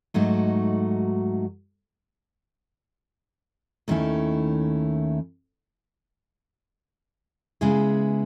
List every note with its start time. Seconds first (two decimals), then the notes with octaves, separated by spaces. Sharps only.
0.14 G#2 F#3 A3 D#4 F#4
3.88 D#2 D#3 A3 C#4 E4
7.61 C#3 G#3 B3 E4 G#4